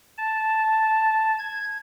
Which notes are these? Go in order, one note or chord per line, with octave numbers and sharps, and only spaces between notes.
A5
G#6